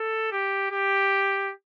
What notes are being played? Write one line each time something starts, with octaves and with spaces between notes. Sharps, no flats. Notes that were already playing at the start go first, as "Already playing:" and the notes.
Already playing: A4
G4
G4